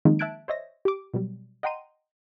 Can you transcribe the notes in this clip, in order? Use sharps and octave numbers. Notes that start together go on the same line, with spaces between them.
D#3 F3 G#3 A#3 C4 D#4
E5 A5 F#6 G#6 D7
C5 C#5 D#5 E5 A#6
G4 D6
B2 F#3 G3
D#5 F#5 G5 A#5 C6 D#7